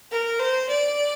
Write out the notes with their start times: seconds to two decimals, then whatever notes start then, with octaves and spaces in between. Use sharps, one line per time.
0.11 A#4
0.39 C5
0.68 D5